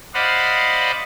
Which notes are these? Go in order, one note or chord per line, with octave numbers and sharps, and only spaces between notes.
C5 D5 D#5 F5 F#5 B5